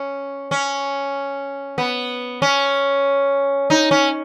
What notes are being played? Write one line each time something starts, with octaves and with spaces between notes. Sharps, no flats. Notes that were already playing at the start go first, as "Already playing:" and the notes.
Already playing: C#4
C#4
B3
C#4
D#4
C#4